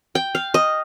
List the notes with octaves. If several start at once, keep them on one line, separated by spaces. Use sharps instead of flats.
G5
F5
D#5